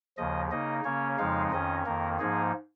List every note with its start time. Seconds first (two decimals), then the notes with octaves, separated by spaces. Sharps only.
0.18 D#2 C#3 F3 D#5
0.51 C#3 A#3 D#4 D#5
0.85 C#3 A#3 C#4 C#5
1.18 F2 C#3 F3 G#3 D#4 F5
1.51 F2 D#3 C#4 D#5
1.85 F2 D#3 A#3 A#4
2.19 G#2 F3 A#3 D#4 G#4